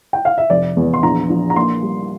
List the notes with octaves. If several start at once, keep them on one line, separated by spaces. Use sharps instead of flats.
G5
F5
E5
F1 D5
E2
C6
A#1 A#5
A#1
A#5
A#3 C6
G3